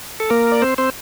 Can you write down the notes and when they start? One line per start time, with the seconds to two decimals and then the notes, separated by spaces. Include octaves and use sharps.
0.20 A4
0.30 A#3 A#4
0.52 D5
0.62 C4 C5
0.78 C4 C5